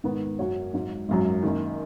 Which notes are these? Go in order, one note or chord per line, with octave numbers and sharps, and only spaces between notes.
G#2 D#3 B3
F#2 F#3 C#4 F#4 C#5
G#1 G#2 F#3
G#1 F#2 F#3
F#1 F#2 D#3